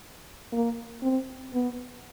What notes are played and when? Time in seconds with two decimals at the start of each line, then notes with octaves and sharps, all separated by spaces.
0.53 A#3
1.03 C4
1.54 B3